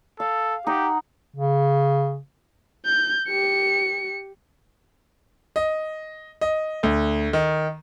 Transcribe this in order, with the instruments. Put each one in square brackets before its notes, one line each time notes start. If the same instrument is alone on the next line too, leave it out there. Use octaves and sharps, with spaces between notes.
[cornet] A4 [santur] F5
[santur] D#4 F#5 [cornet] G4
[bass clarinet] C#3
[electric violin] G6
G4 C#7
[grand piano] D#5
D#5
D2
D#3